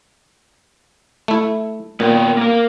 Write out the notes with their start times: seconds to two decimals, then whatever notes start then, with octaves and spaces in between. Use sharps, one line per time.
1.28 A3 E4
2.00 A#2 B3 A#4 G5
2.37 A#3 A#4